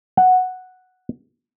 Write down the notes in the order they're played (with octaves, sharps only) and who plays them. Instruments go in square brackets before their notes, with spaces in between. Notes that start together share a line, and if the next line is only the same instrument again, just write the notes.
[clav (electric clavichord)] F#5